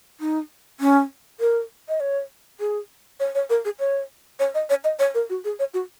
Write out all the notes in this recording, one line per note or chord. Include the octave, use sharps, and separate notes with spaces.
D#4
C#4
A#4
D#5
C#5
G#4
C#5
C#5
A#4
G#4
C#5
C#5
D#5
C#5
D#5
C#5
A#4
F#4
G#4
C#5
F#4